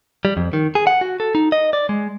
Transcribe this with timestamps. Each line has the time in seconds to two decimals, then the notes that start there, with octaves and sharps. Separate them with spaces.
0.25 G3
0.37 F2
0.53 D#3
0.75 G#4
0.87 F#5
1.01 F#4
1.20 A4
1.35 D#4
1.52 D#5
1.73 D5
1.89 G#3